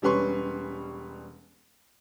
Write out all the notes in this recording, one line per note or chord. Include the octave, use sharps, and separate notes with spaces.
E1 G3 C#4 B4 C6 C#6